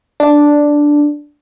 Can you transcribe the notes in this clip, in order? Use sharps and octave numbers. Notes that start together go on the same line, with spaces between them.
D4